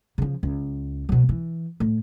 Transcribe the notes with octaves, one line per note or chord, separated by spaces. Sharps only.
C#3 F3
C#2
B2 F#3
E3
A2